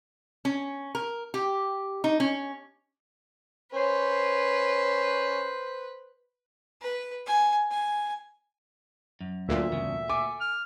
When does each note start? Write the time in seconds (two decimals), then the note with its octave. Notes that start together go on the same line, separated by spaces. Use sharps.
0.45 C#4
0.95 A#4
1.34 G4
2.04 D#4
2.20 C#4
3.75 C#4 B4 C5
6.81 B4
7.26 G#5
7.71 G#5
9.21 F#2
9.49 D2 A#2 E5
9.72 E2 G2 C#3
10.10 A4 G#5 D6
10.41 F6